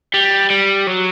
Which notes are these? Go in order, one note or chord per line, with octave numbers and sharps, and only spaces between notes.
G3
G3
F#3